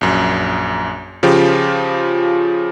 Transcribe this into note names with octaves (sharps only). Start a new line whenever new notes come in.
A#1 F#2
C#3 F3 F4 G4